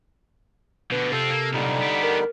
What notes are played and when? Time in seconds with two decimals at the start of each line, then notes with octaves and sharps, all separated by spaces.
0.91 B2 D3 B4
1.12 C3 C4 F4 A4
1.30 A#3
1.53 B1 A#2 D3 G3 D#4
1.80 B3 G4
2.03 A#4